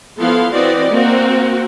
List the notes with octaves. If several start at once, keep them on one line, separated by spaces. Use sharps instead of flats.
F3 B3 E4 A4 F5 C6
E3 C4 F#4 D5 D#5
A#3 C4 F#4